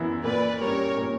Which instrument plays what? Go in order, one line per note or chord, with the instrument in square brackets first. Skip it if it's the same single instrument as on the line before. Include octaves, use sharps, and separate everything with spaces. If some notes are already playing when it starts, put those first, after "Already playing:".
Already playing: [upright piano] F#2 E3 B3 E4
[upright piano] A#2 [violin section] B4 D5
[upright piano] G3 C#4 [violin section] A#4 C#5
[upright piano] A#2